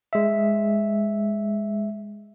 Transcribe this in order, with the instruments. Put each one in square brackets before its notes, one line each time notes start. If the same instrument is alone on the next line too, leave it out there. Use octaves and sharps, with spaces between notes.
[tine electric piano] G#3 E5